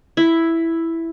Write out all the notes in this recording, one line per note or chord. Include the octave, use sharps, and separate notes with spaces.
E4